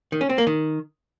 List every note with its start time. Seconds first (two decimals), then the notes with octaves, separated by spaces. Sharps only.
0.12 D#3
0.21 C#4
0.29 C4
0.38 A#3
0.47 D#3